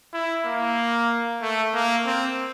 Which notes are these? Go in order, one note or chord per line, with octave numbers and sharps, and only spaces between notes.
E4
A#3
A3
A#3
C4